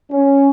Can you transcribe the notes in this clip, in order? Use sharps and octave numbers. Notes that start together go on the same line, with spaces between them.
C#4